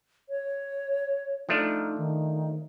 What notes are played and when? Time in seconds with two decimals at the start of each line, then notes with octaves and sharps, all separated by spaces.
0.29 C#5
1.49 F3 A3 D4 D#4
1.98 D#3